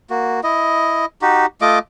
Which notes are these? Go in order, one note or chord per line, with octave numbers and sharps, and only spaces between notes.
A#3 F#4
E4 D#5
D#4 F#4 G4
A3 F4 D#5 D6